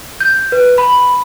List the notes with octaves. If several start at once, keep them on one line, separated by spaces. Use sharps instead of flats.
G6
B4
B5